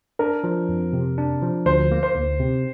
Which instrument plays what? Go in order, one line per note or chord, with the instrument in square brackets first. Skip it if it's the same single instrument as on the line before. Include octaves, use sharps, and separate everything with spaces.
[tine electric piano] D4 [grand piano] A#4
[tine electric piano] F3
F2
C3
D4
F3
[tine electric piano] D2 [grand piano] C5
[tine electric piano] A#3
[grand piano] C5
[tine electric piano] D2
C3